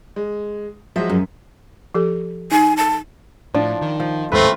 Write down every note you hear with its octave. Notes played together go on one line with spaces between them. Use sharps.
G#3
F3 F#3 G#3 E5
F#2
F3 G4 A4
D#4 G#5
A5
A2 F3 D4
D#3
F3
D1 D#2 G#2 A3 C4 F4 B4